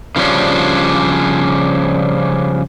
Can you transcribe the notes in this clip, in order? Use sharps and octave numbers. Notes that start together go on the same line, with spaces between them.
C#3 F3 G3 C#4 D4